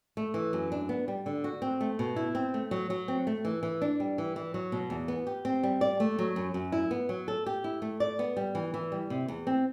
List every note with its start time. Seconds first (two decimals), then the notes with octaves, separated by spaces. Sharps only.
0.17 A3
0.34 E3
0.53 F#2
0.72 D4
0.89 B3
1.08 G3
1.26 D3
1.44 F#4
1.62 C4
1.81 A3
1.99 B2
2.16 E4
2.35 C4
2.54 A3
2.71 F#3
2.90 F#3
3.08 C4
3.27 A3
3.45 E3
3.63 E3
3.82 D4
4.00 G3
4.18 E3
4.36 E3
4.54 F#3
4.72 B2
4.90 E2
5.08 B3
5.27 G4
5.45 C4
5.63 G3
5.81 D5
6.00 A3
6.19 F#3
6.36 F#2
6.54 F#2
6.72 E4
6.91 B3
7.09 F#3
7.28 A4
7.46 G4
7.64 E4
7.82 A3
8.00 D5
8.19 B3
8.37 G3
8.55 E3
8.74 E3
8.92 G3
9.10 C3
9.28 E2
9.47 C4